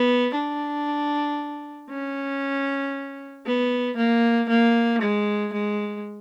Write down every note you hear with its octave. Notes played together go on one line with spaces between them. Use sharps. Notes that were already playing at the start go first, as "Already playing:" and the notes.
Already playing: B3
D4
C#4
B3
A#3
A#3
G#3
G#3